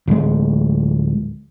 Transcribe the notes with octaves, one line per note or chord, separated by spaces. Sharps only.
D1 G#3